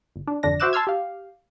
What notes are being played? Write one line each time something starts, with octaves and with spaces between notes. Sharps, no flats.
G1
D4
G#1 F2 D3 D4 A#6
F#4 C5 E5 D6 F#6 E7
A5 C6 E6 F6 G#6
G4 F5